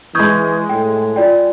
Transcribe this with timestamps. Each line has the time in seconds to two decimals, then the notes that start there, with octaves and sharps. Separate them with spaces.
0.15 E3 G#3 C#6 D#6 G6 G#6
0.69 A2 G5
1.16 F4 D5 G5